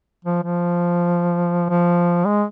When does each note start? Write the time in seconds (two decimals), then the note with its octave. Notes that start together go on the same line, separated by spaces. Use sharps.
0.25 F3
0.43 F3
1.70 F3
2.25 G#3